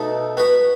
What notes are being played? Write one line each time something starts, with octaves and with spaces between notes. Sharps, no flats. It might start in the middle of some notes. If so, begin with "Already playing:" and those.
Already playing: B2 A3 D#4 A4
B3 F#4 B4